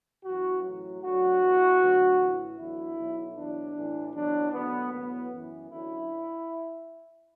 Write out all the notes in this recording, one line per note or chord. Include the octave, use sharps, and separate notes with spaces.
F#2 E3 F#4
A1 A2 F#3
D2 D3 F#3 F#4
E2 E3
D2 D3 F#3
A1 A2 E3
E2 D3 F#3 E4
B1 B2 F#3
E2 B2 F#3 D4
A1 A2 E3
E2 B2 F#3 D4
D2 D3 F#3 B3
A1 A2 F#3 B3
F#2 E3
F#2 D3 F#3 E4